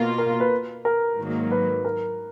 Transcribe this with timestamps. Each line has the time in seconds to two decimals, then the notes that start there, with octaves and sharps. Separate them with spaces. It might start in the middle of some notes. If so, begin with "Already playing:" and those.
Already playing: B2 A#3 F4
0.18 A#4
0.40 B4
0.85 A#4
1.18 G#2 D#3 F#3 A#3
1.51 B4
1.85 A#4